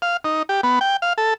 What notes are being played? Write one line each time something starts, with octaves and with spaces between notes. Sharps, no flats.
F5
D#4
G4
B3
G5
F5
A4